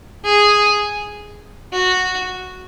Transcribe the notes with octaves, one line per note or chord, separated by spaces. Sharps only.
G#4
F#4